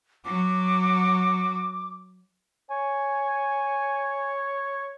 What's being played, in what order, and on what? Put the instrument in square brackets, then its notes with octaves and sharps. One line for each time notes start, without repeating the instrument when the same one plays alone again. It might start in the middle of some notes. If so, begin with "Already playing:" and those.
[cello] F#3 F#4 [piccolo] D6
[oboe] C#5 [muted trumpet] G#5